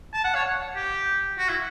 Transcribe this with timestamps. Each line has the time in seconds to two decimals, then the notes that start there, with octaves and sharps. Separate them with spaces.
0.14 A5
0.24 F#5
0.35 C#5
0.76 G4
1.39 F#4
1.49 E4